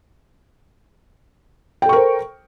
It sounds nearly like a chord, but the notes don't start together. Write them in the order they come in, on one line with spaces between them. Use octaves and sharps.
G5 A4 C#6 A#4 C5